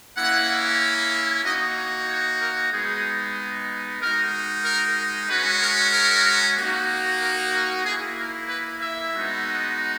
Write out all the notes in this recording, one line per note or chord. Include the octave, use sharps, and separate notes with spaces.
A#3 C#4 E4 F#5
A#3 D#4 F#4 D#5
C#5
C#5
A#4
G#3 B3 D#4 G#4
G#3 D#4 F#4 A#4
A#4
G#3 C#4 F#4 B4
A#4
A#4
A#3 D#4 F#4
A#4
A#4
A#3 E4 G#4
A#4
B4
E5
G#3 B3 D#4 F#4